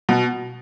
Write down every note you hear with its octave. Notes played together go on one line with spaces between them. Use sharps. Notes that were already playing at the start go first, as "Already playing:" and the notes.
B2